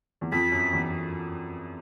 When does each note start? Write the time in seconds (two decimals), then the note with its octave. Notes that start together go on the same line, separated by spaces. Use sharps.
0.21 E2
0.32 F2 B6
0.52 F#2
0.73 E2